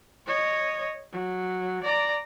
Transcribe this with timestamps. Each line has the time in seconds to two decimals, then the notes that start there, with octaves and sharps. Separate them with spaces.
0.27 C#5 D#5
1.12 F#3
1.83 D5 A#5